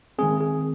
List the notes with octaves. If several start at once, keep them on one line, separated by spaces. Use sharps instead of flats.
D#3 G#3 C4 G#4
G#4